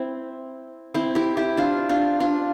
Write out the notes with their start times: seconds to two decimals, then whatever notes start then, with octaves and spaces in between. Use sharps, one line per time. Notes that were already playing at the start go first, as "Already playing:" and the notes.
Already playing: C4 E4
0.94 C4 E4
1.15 E4 G4
1.37 E4 G4
1.57 D4 F4
1.89 D4 F4
2.20 D4 F4